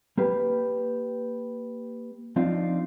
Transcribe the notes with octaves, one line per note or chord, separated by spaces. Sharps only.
A#3 G4 B4
F3 C4 D4 D#4 F4